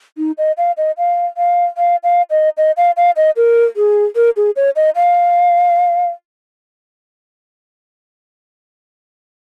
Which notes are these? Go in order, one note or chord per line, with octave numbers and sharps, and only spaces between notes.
D#4
D#5
F5
D#5
F5
F5
F5
F5
D#5
D#5
F5
F5
D#5
A#4
G#4
A#4
G#4
C#5
D#5
F5